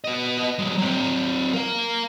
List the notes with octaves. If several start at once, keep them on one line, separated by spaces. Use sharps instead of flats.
B3 D#5
F#3 G#3
F#3 C4
A#4 F5